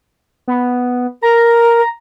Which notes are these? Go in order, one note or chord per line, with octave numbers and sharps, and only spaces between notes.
B3
A#4 A#5